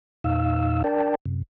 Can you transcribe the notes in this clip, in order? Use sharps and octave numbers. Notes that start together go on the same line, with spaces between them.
E2 A#2 D#4 F5 E6
D4 A#4 D5 G5 A5
F#2 C3